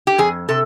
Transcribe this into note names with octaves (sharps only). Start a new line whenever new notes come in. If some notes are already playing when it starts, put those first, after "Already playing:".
G4
F2 G#4
C3 A4